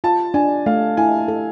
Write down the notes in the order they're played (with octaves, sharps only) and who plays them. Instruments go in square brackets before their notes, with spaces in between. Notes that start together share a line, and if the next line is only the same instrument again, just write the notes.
[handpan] F4 [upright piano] A5
[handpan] D4 [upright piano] G#5
[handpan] A3 [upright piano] F5
[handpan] E4 [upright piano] G#5
[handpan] A4